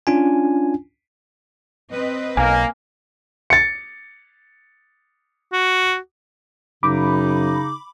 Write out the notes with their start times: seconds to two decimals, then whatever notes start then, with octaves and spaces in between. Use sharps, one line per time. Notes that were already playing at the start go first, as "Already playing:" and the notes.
0.07 C#4 D4 F4 G#5
1.90 C4 B4 D#5
2.37 B1 A#3 G#5
3.50 A6 C#7
5.53 F#4
6.83 F#2 C#3 D#4 B5 D6